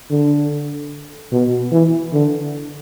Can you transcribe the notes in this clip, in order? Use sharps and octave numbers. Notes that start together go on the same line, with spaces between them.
D3
B2
E3
D3